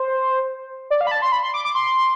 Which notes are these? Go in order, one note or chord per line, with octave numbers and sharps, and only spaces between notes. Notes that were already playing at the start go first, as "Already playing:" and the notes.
Already playing: C5
D5
F5
B5
A5
C6
B5
C6
D6
D6
C6